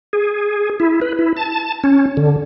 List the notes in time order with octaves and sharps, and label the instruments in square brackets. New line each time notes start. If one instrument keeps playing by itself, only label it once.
[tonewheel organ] G#4
E4
B4
E4
A5
C#4
D3